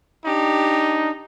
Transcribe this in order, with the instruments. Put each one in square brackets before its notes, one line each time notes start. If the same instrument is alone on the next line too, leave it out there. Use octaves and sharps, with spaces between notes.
[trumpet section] D4 D#4 [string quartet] G4